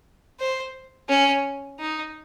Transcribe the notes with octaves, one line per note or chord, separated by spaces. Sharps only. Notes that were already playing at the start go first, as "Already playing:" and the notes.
C5
C#4
D#4